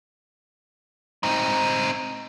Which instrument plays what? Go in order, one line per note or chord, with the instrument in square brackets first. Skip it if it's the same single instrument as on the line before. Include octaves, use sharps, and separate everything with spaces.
[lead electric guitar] C4 D#4